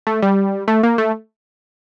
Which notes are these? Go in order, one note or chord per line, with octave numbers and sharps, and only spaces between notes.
A3
G3
A3
A#3
A3